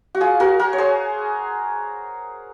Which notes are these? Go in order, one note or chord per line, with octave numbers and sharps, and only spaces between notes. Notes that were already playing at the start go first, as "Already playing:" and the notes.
F#4
F4 G#4
F#4 A#4
F#4 A#4
C#5
G#4 C5